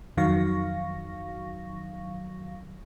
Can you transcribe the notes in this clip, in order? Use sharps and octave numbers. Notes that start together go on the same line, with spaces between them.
F2 D#3 F#3 F5 C#6 A#6